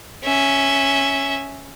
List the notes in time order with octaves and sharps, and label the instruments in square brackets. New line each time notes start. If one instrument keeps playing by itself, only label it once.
[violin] C#4 E5